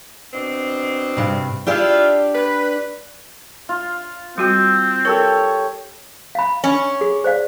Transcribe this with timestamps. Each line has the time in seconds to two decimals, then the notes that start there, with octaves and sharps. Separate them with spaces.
0.33 B2 C4 D4
1.17 G2 C3
1.67 D4 E4 F4 G4 D5
2.33 B4
3.69 F4
4.38 G3 C4 F#4 G5
5.05 G4 A4 A#4 C#5
6.35 F5 B5
6.64 C#4
7.01 G#4
7.24 C5 D5 F5